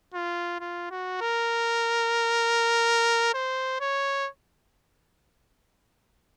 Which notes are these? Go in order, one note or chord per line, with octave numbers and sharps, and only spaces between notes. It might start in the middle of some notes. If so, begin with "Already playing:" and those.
F4
F4
F#4
A#4
C5
C#5